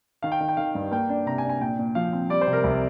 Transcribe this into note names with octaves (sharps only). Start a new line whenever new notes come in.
D#3 F5
G5
D#3
G5
D#3 F5
G2
A#3 G5
D4
C3 A#5
G#5
D4
G#5
A#2 G5
A#2
F3 F5
C4
G3 D5
C5
C3
A#4
C2